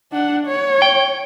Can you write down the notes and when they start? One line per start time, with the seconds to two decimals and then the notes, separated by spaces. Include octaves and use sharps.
0.12 D4 F#5
0.47 C#5
0.82 G5